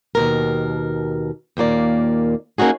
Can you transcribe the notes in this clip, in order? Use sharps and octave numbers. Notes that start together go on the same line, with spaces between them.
D#2 B2 A#4
D#2 A#2 A#3 D5
A#3 C#4 D#4 F#4 G#4